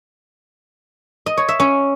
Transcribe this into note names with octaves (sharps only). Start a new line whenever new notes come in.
D#5
C#5
E5
C#4